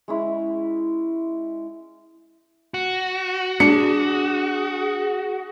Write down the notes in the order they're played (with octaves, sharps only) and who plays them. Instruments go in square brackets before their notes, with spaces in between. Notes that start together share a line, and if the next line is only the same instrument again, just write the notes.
[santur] G#3 C#4 E4
[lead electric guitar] F#4
[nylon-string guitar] D4 [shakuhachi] G#4 [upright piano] C#7